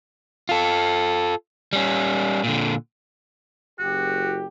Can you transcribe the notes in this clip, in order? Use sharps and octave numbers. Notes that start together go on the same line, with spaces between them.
F4 A4
G3 C#4
A#2 D3
F#1 F#4 G4